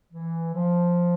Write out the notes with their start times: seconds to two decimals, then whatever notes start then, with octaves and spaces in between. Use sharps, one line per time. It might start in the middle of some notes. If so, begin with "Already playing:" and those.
0.12 E3
0.54 F3